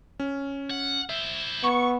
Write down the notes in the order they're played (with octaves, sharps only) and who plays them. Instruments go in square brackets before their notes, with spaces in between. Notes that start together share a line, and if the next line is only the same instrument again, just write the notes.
[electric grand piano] C#4
[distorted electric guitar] F#5
[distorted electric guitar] E4 C5 [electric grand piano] E5
[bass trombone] B3 [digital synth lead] C#6